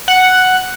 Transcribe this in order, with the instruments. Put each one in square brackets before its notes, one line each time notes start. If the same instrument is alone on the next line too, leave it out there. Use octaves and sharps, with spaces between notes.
[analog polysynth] F#5